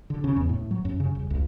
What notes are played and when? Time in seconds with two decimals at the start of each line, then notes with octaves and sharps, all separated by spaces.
0.10 D3
0.24 C#3
0.36 E2
0.49 A2
0.71 F#3
0.85 F#2
1.00 C#3
1.15 D#1
1.30 C#2